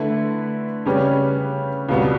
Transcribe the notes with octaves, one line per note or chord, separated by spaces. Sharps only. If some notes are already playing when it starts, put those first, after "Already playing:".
Already playing: D3 A3 E4 B4
C#3 G3 C#4 G4 B4
C#2 B2 G3 B3